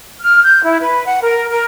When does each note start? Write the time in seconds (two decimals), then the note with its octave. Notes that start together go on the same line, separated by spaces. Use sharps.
0.21 F6
0.44 G6
0.63 E4
0.80 B4
1.06 F#5
1.21 A#4
1.49 A#4